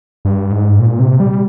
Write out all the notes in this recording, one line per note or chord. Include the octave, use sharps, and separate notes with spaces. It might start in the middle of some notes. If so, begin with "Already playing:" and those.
G2
G#2
A#2
C3
G3